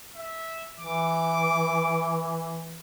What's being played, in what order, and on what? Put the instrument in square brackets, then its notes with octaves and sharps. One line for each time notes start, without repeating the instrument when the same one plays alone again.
[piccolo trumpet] E5
[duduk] E3 [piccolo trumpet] D6